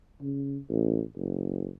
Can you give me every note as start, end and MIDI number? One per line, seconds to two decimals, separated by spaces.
0.21 0.59 49
0.69 1.01 33
1.17 1.71 30